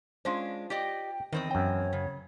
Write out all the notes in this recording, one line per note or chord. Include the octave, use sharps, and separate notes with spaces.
G#3 C#4 D4 F4 C5
G4 D5 D#5 G5
E2 D#3 C4 D#5
F#2 C#5 G5
C#3